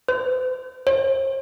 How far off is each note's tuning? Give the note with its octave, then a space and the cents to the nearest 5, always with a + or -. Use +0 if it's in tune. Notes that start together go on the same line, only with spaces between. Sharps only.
C5 -45
C5 +45